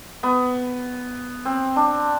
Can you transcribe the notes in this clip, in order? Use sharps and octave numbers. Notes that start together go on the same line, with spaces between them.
B3
C4
D4